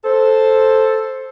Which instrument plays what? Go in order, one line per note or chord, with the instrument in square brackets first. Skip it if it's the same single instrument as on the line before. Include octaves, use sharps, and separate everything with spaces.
[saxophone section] A4 C5